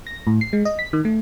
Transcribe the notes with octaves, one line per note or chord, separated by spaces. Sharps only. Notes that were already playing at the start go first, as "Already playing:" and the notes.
A#6
A2
C7
G#3
D#5
B6
D#3
A3